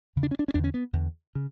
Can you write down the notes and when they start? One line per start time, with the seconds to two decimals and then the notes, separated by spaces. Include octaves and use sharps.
0.16 E2 C#3
0.23 D4
0.31 C#4
0.39 D4
0.48 C#4
0.54 E2 D3 D4
0.64 C#4
0.74 B3
0.93 E2 D3
1.35 C#3